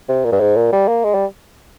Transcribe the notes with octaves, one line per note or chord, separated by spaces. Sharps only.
C3
A#2
G2
G#2
A#2
G3
A#3
G#3
G3